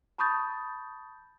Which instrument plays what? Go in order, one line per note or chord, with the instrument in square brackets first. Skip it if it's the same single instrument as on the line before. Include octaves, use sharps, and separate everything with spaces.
[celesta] A5 B5 C#6 D#6 G6 A6